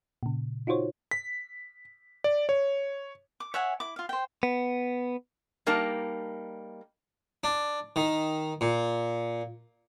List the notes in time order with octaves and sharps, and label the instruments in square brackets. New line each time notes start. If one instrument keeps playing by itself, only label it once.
[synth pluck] A#2 C#3
D#4 F4 F#4 C5 C#5
[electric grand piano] B6
D5
C#5
[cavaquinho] D6
C#5 E5 F#5 G#5
E4 D6
F4 F5
C5 G5
[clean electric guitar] B3
[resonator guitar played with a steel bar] G3 A#3 D#4 A5
[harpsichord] D4
D#3
A#2